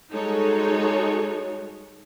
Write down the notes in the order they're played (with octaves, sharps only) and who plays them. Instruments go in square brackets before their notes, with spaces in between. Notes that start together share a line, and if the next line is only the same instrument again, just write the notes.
[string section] G3 G#3 D#4 F#4 A4 C#5